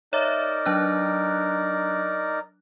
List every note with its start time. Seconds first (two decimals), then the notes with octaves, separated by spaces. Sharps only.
0.13 D#4 A#4 C#5 D5 E5
0.66 F#3 D4 F#6